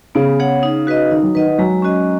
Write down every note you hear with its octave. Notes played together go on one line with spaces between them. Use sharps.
C#3 B3
G#4 C#5 F#5
D#4
F#4 B4 D#5
D#3 D#4
F#3
D#3 B4 D#5 F#5
D#3
F#3 G#3
C#4 F#4 D#5